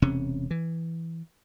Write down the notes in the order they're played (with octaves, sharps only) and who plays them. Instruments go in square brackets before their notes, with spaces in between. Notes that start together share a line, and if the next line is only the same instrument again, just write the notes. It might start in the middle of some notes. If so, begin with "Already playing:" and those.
[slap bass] E1 C3 C#4
E3